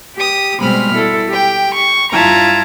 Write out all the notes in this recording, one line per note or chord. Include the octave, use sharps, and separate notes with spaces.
G4 D#6
B2 G3 G#3 C4 B5 F6
E4 A4
G4 G5
C#6
G2 E4 F4 A5 A#5 G#6